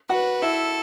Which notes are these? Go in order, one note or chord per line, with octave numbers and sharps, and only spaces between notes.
F#4 B4 F#5
E4 A4 E5